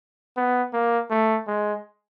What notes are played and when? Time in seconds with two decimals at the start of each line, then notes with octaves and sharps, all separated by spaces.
0.37 B3
0.73 A#3
1.10 A3
1.47 G#3